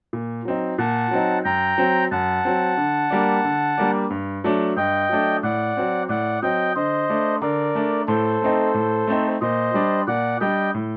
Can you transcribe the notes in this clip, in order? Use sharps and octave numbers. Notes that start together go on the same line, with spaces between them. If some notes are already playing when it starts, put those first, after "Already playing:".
A#2
F#3 C4 D#4
A#2 F#5 A5
F#3 C4 D#4
F#2 G5 A#5
F#3 C4
F#2 F#5 A5
F#3 C4
D3
G3 A#3 D4
D3
G3 A#3 D4
G2
F#3 A3 D4
G2 D#5 G5
F#3 A3 D4
A2 D5 F#5
F#3 C4
A2 D5 F#5
F#3 C4 D#5 G5
D3 C5 D#5
A3 D4
D3 A#4 D5
A3 D4
A2 A4 C5
A3 C4 D#4
A2
A3 C4 D#4
A#2 C5 D#5
G3 D4
A#2 D5 F#5
G3 D4 D#5 G5
A2